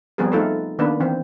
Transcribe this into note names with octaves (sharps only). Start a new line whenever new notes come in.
F3 G3 B3 C4 G#4 A#4
A3 D#4 F4 A4 B4
D#3 A#3 B3 D4 B4
E3 C4